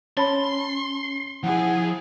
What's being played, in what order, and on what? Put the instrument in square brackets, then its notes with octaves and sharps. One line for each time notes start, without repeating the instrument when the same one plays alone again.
[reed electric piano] C#4 [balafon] C#5 A5 B5 [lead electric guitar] C6
[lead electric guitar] F3 [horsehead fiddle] E4 G#4 [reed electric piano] F#5